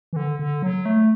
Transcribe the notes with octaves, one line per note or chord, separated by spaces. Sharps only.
E3
D3
D3
F#3
A3